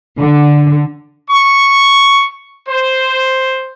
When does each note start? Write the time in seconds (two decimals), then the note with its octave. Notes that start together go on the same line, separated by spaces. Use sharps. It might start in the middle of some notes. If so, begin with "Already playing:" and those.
0.19 D3
1.30 C#6
2.68 C5